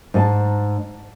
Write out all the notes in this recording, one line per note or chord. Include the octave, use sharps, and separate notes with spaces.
G#2 G#5 A5